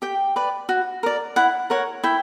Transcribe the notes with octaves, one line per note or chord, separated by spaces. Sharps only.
G4 G5
B4 D5
F#4
A#4 D5
E4 F#5
A#4 C#5 F#5
E4 G5